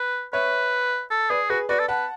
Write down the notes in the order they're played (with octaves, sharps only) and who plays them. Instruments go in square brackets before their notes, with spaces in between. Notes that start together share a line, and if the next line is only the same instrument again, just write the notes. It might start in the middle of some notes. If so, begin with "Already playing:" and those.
Already playing: [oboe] B4
[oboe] B4 [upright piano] C#5 E5
[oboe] A4
[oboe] G#4 [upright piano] B4 D5
[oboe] F#4 [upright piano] G#4 B4
[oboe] F#4 [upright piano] B4 D5
[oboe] A4
[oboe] B4 [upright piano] F#5 A5